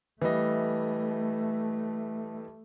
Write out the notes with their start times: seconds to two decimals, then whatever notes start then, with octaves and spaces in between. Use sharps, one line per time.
0.22 E3 G3 A3 D#5